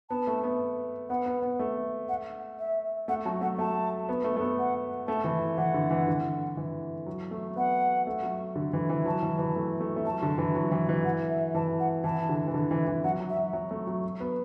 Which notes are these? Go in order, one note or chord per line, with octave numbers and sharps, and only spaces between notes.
B3 A5
A3
B3
B3 F#5
B3
B3
A3
F#5
E5
A3 F#5
F#3 A5
A3 F#5
A3 A5
B3
A3
A3
B3
F#5
A3 A5
E3
E3 F#5
D3
E3
D3
E3
F#3
A3
B3 F#5
A3
F#3
D3
E3
E3
F#3 A5
E3
E3
A3
A3
A3
F#3 A5
D3
E3
F#3
E3
E3
F#5
E5
E3 A5
F#5
E3 A5
D3
E3
D3
E3
E3
F#3 F#5
F#3
E5
F#3
A3
F#3
B3